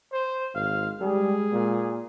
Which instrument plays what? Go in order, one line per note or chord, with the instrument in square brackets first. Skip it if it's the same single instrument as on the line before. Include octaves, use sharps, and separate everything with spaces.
[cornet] C5
[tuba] G#1 [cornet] F5
[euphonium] G3 [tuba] G#3 [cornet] G#4
[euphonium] A#2